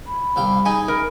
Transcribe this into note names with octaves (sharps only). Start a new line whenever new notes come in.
B5
C2 F5 G5
D#4 G#4 G#5
A#4